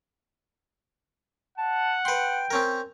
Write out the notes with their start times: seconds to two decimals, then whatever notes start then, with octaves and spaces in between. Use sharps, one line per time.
1.58 F#5 A5
2.05 B4 G5 C6
2.51 C4 C#4 A#4